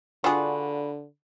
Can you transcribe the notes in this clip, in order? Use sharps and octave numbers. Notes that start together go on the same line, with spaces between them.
D3 D4 F4 F#4 G#4 B4